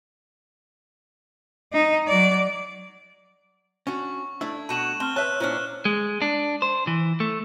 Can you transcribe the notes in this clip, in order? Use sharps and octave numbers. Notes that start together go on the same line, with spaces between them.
D#4
F#3 D5
C#4 D4 F#4 C#6
A3 D4 E4 E6 G#6
B2 F#4 F#5 A5 D#7 E7 F#7
C4 A5 F6 G7
B4 C#5 E5 A5 E6 F#6 D#7
A#2 C#4 D4 E4 C5
G#3
D4
C5
E3
A3